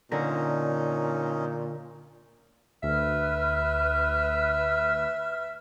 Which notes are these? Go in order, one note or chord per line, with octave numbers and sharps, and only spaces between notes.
A#2 D3 C#4 D#4 A#4
D2 B4 E5 F6